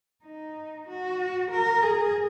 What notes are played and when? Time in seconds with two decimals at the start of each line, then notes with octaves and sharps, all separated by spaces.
0.25 D#4
0.87 F#4
1.51 A#4
1.83 G#4